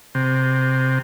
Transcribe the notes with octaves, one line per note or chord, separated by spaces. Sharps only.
C3